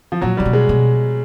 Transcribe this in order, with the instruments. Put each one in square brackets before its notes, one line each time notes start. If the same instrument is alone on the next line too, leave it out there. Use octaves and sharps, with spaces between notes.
[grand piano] F3
[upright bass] A#2 [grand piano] F#3
[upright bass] C3 [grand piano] G3
[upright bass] B2
[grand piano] G#3
[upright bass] B2